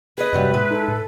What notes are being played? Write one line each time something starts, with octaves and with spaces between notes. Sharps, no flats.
G#4 B4 D#5
F#2 C3 F#3 G3
A2 G#3 E4
D#4 A4
A2